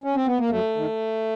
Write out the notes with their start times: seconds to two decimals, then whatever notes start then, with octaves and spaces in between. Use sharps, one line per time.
0.04 C#4
0.15 C4
0.27 B3
0.39 A#3
0.50 F#2 A3
0.76 D#3